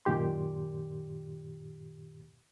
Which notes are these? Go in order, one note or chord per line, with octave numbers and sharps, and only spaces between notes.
F#2 A#2 D#3 G4 C6